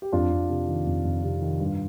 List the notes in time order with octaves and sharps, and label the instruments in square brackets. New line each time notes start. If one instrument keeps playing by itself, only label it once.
[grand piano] G4
F2 D4 F4
F2
C3
D#3
F2
F2
C3
D#3
G2